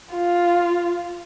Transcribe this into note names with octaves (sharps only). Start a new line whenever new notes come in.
F4